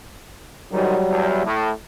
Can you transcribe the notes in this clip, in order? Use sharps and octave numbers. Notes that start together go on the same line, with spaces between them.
G#2 D#3 F#3 G3
E2
A2